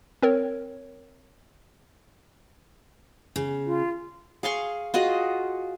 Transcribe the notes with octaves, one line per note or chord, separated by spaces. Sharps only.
C4 A#4 C#5
C#3
F4
G#4 F5 C6 C#6
F4 F#4 G#4 D#5